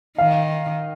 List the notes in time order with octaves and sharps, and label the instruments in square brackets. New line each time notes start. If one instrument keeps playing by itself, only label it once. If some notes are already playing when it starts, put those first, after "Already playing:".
[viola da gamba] D#3 [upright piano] F5